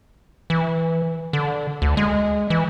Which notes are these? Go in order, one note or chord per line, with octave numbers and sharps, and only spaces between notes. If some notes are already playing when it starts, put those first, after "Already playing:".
E3
D3
D2
G#3
E3